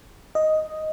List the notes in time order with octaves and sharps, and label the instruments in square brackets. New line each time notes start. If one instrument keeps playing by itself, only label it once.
[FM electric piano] D#5